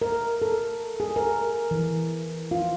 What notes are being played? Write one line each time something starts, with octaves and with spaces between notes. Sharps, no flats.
A#4
A4
G#4
A#4
E3
F4